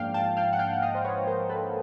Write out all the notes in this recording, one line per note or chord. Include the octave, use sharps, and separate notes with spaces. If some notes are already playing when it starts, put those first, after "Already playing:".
Already playing: G#2 F3 A#3 D4 F5 G5
G5 A5
F5 G5
F#5
F5 G5
F#5
D#5 F5
C5
B4 C#5
A#4 C5
A4 B4